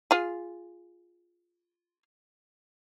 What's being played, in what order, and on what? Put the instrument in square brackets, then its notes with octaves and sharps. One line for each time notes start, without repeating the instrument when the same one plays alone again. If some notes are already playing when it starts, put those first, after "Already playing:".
[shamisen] F4 G#4